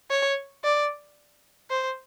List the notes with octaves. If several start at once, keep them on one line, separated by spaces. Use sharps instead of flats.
C#5
D5
C5